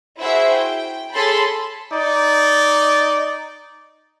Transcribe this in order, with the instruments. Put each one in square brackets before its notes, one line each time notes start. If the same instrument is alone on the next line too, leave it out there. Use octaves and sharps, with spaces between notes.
[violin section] E4 F#4 G#4 C5 E5
G5
G#4 A4 C#5 A5 B5 C6
[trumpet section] D#4 D5